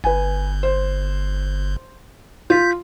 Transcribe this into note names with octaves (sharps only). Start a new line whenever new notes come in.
G1 B4 G#5
C5
F4 G6 B6